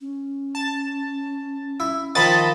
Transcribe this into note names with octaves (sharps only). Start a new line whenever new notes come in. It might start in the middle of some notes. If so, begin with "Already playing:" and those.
C#4
A5
E4
D#3 F3 D#5 A5 B5 A6